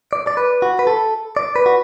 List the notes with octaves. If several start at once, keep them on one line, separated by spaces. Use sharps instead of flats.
D5
D5
B4
F#4
B4
A4
D5
B4
F#4